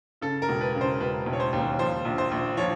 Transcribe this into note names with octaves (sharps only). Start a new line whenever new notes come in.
C#3 A4
A#4
E1
B4
C#3
C5
E1 B4
E1
C#5
C5
D#2
F3 C5
A#1
C5
A#1
F3 C#5